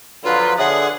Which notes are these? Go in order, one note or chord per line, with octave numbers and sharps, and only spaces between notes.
D3 F3 F#3 F4 B4
D3 G#4 C#5 E5 F#5 D#6